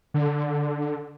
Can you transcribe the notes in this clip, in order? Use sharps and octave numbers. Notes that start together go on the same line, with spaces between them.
D3